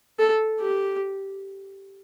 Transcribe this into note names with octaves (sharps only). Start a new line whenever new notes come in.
A4
G4